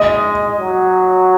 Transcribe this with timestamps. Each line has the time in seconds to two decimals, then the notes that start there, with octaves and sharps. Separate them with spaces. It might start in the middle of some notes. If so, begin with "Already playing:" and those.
Already playing: G#3 D#5
0.58 F#3